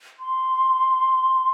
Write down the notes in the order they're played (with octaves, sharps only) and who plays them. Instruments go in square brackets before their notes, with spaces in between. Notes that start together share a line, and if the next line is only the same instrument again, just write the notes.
[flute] C6